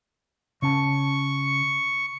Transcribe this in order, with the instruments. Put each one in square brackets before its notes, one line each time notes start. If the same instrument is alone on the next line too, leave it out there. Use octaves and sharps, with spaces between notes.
[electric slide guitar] C#3 C#4 A5 [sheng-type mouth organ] C#6